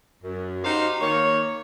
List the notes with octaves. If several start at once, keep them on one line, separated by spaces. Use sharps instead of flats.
F#2
D#4 F#4 G4 C5 F5
D#3 A#3 C#5